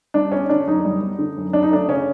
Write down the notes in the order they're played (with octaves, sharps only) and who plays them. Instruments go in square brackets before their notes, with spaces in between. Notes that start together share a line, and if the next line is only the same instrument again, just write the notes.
[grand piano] G3 D4
B3 C#4
D3 D4
F#2 D#4
G3
B3
D3
F#2
F#3 D4
D#4
A3 D4
C#3 C#4